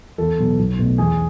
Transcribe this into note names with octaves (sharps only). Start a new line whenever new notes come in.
E2 A4
B2 F#3 B3
B1
B2 A3
E2 G#4